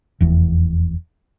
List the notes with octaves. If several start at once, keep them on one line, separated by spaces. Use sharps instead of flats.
F1 E2